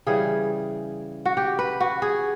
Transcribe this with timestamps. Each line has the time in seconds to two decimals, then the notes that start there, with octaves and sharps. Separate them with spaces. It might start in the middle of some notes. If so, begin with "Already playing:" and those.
0.06 C#3 E3 G3 G#4
1.25 F#4
1.37 G4
1.59 B4
1.80 F#4
2.02 G#4